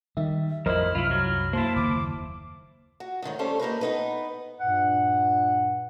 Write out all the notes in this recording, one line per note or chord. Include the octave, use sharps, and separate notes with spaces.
D#3 G3 E5
A1 F2 F#3 E4 A#4 C5 D#5 F6
C2 F#2 E4 F4 B5
F#3 F6
A#3 E4 C5 A5 C6
F#1 D#2 D6
F#4
D2 G#2 D#3 C#4
G3 A3 C#4 A4 C5 C#5
A#3 D#4 A#4 B4
B3 D#4 B4
G2 A#2 F#5